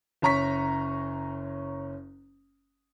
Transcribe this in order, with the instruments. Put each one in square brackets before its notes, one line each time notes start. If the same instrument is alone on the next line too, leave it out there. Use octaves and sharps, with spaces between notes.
[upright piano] F#1 C#4 A#5 C#6 B6